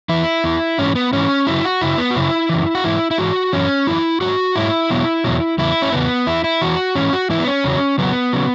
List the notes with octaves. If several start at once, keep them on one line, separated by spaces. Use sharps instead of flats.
E2 E3 E4
E2 E3
G#2 E3 C#4
B3
G#2 E3 C#4
F#2 C#3 F#3 E4
F#4
F#2 C#3 F#3 E4
B3
F#4
F#2 C#3 E4
F#2 C#3 E3
F#4
G#2 E3 E4
E4
G#2 E3 F#4
F#2 E3 C#4
F#2 E3 E4
G#2 F#3 F#4
G#2 F#3 E4
E2 B2 F#3
E2 B2 F#3
E2 C#3 E4
C#4
E2 C#3 B3
E2 E3 E4
E4
E2 E3 F#4
G#2 E3 C#4
F#4
G#2 E3 E4
B3
C#4
E2 C#3 F#3
E2 C#3 F#3 B3
C#3 F#3